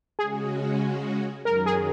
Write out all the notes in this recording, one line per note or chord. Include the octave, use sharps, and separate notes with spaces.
C#3 G#3 C#4 F#4 G#4
F#2 D#3 F#3 A#4
G#4